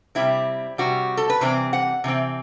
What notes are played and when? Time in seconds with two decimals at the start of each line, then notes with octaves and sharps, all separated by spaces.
0.15 C3 G3 C4 E4
0.78 C3 G3 C4 F#4
1.17 A4
1.30 B4
1.41 C3 E3 G3 C4 C5
1.73 F#5
2.04 C3 E3 C4